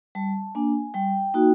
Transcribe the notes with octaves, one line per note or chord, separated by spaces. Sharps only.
G3 A5
A#3 D4 G#5
G3 G5
A#3 D#4 F#4